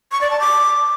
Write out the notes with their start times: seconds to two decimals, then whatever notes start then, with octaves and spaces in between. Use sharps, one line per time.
0.12 C#6
0.21 D5
0.30 A5
0.40 D6